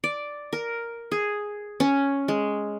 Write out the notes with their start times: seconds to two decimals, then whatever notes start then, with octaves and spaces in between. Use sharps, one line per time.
0.04 D5
0.53 A#4
1.12 G#4
1.80 C#4
2.28 G#3